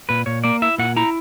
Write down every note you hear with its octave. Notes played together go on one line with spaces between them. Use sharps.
A#2 B4
A#2 C#5
A#3 D5
E4 E5
A#2 F#5
E4 A#5